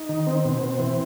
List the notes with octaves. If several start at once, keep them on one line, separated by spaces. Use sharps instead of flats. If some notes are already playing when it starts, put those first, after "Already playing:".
Already playing: D#4
D#3
C4
B2
C4
E3